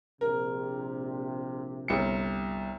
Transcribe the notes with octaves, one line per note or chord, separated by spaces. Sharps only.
A#1 C3 A#4
G1 C2 C#7